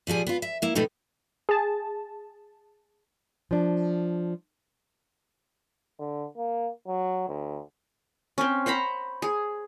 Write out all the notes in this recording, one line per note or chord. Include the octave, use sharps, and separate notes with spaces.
A#2 F3 G3 G#4
B3 F4
E5
A#3 E4
B2 D#3 A3 B3 D#4
G#4 A5
F3 D4
D3
A#3
F#3
D2
C4 C#4
C5 F#5 A#5 B5
G#4